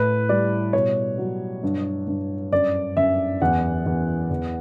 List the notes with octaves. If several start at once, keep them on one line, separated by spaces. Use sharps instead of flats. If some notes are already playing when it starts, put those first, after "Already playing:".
Already playing: A2 B4
G3 D5
B2 C#5
F#3
G2
G2
F#2 D5
F#2 E5
E2 F#5
E2
E2